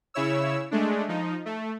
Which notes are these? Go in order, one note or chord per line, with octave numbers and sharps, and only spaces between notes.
C#3 E4 C#5 E6
G#3 A3 D4
F3 D#4
A3